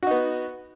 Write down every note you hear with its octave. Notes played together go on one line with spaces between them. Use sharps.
B3 D#4 F#4